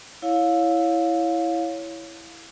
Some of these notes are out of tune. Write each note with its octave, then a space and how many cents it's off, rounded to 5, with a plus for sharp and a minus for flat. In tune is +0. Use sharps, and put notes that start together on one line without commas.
E4 +0 C#5 +10 F5 +20